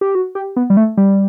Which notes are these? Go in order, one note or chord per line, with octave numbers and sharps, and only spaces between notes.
G4
F#4
G4
B3
G3
A3
G3